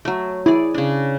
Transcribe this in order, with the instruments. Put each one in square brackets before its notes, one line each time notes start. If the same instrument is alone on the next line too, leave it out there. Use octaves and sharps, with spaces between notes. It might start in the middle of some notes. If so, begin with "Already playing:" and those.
[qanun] F#3 A3
[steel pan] E4 [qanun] G#4 D5
[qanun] C#3 D4